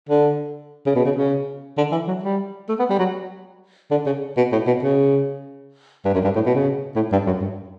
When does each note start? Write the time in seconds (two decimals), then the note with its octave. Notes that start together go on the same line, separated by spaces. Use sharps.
0.09 D3
0.86 C#3
0.96 B2
1.05 C#3
1.16 C#3
1.77 D3
1.92 E3
2.08 F#3
2.23 G3
2.69 A3
2.79 B3
2.90 G3
2.99 F#3
3.91 D3
4.06 C#3
4.37 B2
4.52 A2
4.67 B2
4.83 C#3
6.05 G2
6.14 F#2
6.24 G2
6.35 A2
6.46 B2
6.55 C#3
6.96 A2
7.12 G2
7.26 F#2
7.41 G2